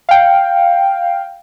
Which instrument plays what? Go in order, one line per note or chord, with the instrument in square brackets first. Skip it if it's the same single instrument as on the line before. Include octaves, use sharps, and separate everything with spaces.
[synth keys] F5 G5